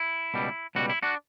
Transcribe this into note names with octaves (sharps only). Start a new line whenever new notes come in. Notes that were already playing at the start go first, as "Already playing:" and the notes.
Already playing: E4
C#2 B2 G3
C#2 B2 G3 F#4
E4
D4 F#4